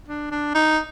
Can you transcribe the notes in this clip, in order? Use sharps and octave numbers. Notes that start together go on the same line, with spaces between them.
D4
D4
D#4